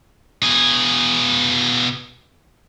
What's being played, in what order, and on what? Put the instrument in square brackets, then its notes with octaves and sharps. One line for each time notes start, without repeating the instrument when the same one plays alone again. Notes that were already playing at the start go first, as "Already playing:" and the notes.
[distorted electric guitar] B2 G#4